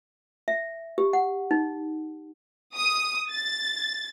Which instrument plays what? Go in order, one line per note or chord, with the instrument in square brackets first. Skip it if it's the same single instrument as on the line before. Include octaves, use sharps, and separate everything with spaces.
[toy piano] E5
G4
F#5
D#4
[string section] D#6
A6